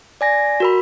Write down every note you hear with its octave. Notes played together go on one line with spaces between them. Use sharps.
D5 G#5 A#6
F#4 A#4 B5